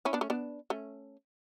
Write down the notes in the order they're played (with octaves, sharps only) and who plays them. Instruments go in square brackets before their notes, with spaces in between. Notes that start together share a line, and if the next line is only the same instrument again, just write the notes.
[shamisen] C#4 E4
B3 D4
A3 C#4
B3 D4
A3 C#4